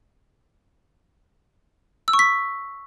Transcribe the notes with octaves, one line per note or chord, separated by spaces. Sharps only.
E6
C#6
B6